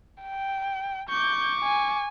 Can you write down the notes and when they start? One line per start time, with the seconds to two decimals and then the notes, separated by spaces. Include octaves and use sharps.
0.22 G5
1.10 C#6 D6 G6
1.64 G#5